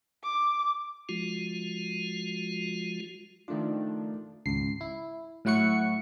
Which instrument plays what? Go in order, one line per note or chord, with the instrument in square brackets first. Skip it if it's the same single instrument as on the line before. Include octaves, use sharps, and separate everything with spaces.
[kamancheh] D6
[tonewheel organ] F3 G#3 F4 F#4
[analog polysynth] D#3 F3 D4 [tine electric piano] A3 F4
[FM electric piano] G#1 C#2 C7
E4
A2 F#3 E4 F#5 C#6 C#7